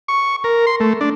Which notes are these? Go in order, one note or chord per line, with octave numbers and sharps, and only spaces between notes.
C#6
A#4
C6
A3
D4